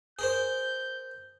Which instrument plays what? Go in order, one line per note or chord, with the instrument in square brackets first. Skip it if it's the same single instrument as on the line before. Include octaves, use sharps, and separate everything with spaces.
[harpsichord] G#4 A#4 C5 [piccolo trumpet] G6